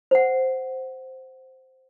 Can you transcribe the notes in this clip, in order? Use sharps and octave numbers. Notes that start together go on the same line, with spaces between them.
C5 F#5